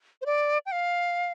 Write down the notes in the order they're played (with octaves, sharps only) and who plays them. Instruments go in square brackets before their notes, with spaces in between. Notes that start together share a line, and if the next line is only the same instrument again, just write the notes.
[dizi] C5
D5
G5
F5